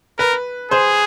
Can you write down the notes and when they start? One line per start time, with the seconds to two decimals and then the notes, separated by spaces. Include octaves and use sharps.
0.19 A#4 B4
0.71 G#4 C5